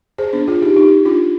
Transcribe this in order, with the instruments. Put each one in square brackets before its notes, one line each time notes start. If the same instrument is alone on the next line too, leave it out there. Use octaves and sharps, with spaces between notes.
[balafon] G#4 C5
B3 D4
F4 G#4
D#4 G4
D#4 G4
D4 F4